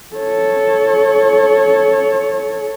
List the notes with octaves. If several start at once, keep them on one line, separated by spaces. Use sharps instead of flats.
A4 C#5